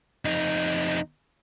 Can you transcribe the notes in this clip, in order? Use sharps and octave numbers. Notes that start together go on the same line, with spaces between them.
F2 D#4